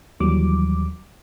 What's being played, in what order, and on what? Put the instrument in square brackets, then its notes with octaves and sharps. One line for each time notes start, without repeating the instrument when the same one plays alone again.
[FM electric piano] D#2 E3 F#3 G3 D6